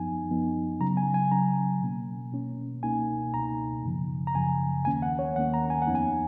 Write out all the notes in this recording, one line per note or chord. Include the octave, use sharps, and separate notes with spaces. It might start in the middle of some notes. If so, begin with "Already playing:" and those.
Already playing: F#2 F3 B3 D#4 G#5
F#2 F3 B3 D#4
C#3 F#3 C#4 A#5
G#5
G#5
C#3 F#3 C#4 A#5
B2 A#3 C#4
B2 A#3 C#4
C#2 B2 A#3 D#4 G#5
C#2 B2 A#3 D#4 A#5
F#2 C#3 F3
A#5
F#2 C#3 F3 G#5
D#2 D#3 A#3 C#4 G#5
F#5
C#5
D#2 D#3 A#3 C#4 F#5
A#5
G#5
F#5
F2 F3 B3 D#4
G#5